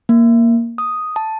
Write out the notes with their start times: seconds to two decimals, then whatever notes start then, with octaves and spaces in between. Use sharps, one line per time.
0.09 A#3
0.78 D#6
1.16 A5